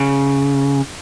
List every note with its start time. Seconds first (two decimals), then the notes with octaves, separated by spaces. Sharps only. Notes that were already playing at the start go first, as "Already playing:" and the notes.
Already playing: C#3